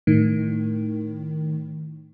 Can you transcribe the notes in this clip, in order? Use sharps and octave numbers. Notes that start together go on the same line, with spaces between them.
A2 D#3